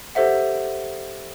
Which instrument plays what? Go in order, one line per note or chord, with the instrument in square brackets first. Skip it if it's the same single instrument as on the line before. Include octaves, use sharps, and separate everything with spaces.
[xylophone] G4 A4 C5 E5 F#5